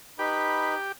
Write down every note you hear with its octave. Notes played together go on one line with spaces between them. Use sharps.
D#4 G4 B4 B5